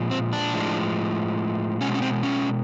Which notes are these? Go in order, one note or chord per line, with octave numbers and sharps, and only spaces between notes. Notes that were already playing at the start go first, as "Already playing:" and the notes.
Already playing: A#2 F3 G#3
C4
D4
A2 F3 G#3
B2 G#3 C#4
C#4
C4
C#4